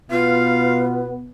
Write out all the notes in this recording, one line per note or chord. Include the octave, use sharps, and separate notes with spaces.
B2 B3 F4 B4 F5